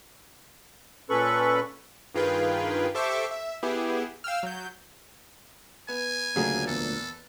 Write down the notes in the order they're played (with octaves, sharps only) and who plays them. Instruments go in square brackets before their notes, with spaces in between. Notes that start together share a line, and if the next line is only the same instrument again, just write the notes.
[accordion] A#2 C#4 A4 B4 B5 C#6
[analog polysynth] G2 D#3 F4 G#4 B4 G5
G4 A4 C5 E5 C#6 D6
E5
B3 E4 G4 G#4
F5 G5 E6 F6
F#3 G6
[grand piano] B3 [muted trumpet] G#5
[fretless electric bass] D2 F#3 A3 [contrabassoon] A#2 [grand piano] C#3 F#4 G#4
[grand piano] E2 [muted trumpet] A4